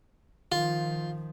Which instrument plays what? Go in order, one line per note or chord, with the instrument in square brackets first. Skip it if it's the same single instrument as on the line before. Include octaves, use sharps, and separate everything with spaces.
[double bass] D#3 F3 [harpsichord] F4